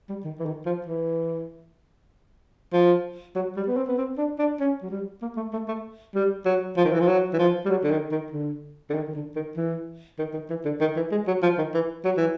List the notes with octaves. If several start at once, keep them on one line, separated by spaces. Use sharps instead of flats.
G3
D#3
E3
D#3
F3
E3
F3
F#3
G3
B3
C4
B3
C4
D4
D4
C#4
F#3
G3
A#3
A3
A3
A3
G3
F#3
F3
D#3
E3
F3
F#3
E3
F3
G3
F#3
D3
D#3
D#3
D3
D3
D#3
D#3
D3
D#3
E3
D#3
D#3
E3
D3
D#3
E3
G#3
F#3
F3
D#3
E3
F#3
E3